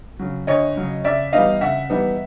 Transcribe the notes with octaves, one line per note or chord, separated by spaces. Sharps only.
C#3 F#3
D2 C#5 D#5
C#3 F#3
C#3 D5 E5
E3 G3 B3 D#4 D#5 F5
C#3 E5 F#5
E3 G3 B3 D#4